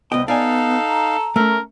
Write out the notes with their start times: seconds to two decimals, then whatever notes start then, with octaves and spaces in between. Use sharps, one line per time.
0.12 C2 B3 D#5 G5
0.28 B3 D#4 A4 D5 F5 G#5
0.88 A#5
1.36 A3 C#4 A#4